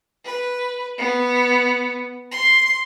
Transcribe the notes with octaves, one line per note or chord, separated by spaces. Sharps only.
B4
B3
C6